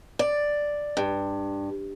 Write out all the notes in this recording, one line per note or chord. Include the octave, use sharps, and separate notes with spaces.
D5
G2